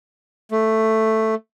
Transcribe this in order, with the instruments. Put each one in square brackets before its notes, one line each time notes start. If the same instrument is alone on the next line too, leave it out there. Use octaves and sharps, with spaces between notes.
[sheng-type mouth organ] A3